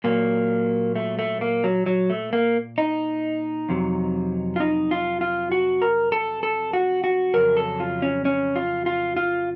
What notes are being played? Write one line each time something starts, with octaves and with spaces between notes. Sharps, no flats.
A#2 F#3 A#3
A3
A3
A#3
F#3
F#3
A3
A#3
D#4
F2 C3 F#3
F4
D#4
F4
F4
F#4
A#4
A4
A4
F#4
F#4
F2 C#3 F#3 A#4
A4
F4
C#4
C#4
F4
F4
F4